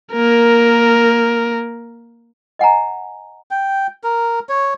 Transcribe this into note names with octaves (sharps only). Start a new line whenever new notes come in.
A#3 A#4
D#5 F#5 G#5 A#5
G5
A#4
C#5